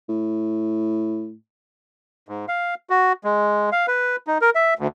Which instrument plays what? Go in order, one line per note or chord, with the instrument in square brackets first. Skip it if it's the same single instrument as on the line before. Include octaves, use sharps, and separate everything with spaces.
[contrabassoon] A2
[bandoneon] G#2
F5
F#4
G#3
F5
B4
D#4
A#4
E5
D2